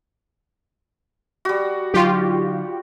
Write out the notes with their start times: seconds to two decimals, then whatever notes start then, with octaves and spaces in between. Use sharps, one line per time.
1.45 G3 F#4
1.94 D3 F#3 D#4 F4 G4